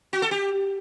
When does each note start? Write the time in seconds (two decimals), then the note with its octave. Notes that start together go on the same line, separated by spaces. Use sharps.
0.13 F#4
0.22 A4
0.31 G4